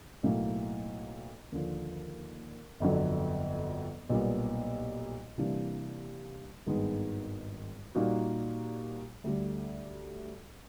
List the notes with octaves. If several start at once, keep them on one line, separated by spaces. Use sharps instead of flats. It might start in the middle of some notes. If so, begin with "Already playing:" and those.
B1 A2 F#3 A#3
D#2 D3 F3
G1 F2 D3 F#3
B1 A#2 G3 B3
C3 E3 G3 A#3 D4
G#1 G2 D#3 G#3 B3
A#2 G3 A#3 D#4 F#4
D2 D3 G3